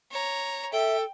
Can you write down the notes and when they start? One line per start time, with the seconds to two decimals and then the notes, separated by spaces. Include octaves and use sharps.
0.11 C#5 A#5
0.73 A4 E5 G5